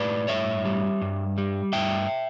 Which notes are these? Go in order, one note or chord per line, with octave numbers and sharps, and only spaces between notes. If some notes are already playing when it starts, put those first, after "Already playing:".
Already playing: A2 B4 D5
G2 C#5 E5
G3
G2
G3
G2 E5 G5